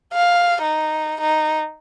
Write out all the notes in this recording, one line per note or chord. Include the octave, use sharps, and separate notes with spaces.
F5
D#4
D#4